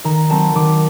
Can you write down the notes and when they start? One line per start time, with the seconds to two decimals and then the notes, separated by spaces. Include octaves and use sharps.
0.04 D#3 A#5
0.30 F#3 C4 A5
0.55 D#3 D6